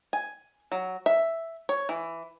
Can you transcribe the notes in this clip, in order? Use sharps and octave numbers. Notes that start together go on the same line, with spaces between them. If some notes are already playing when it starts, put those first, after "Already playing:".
G#5
F#3
E5
C#5
E3